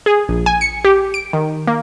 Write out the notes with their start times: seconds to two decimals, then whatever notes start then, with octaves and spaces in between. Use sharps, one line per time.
0.06 G#4
0.29 A#1
0.46 G#5
0.61 C#7
0.85 G4
1.14 D7
1.33 D#3
1.67 A#3